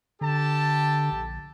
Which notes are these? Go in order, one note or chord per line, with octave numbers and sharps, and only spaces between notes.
D3 G4 A4 A5
A#1